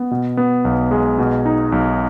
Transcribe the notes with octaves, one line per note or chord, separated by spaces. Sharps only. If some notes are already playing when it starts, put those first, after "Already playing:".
Already playing: B3
B2
B3
B1
G#3
B2
D#4
B1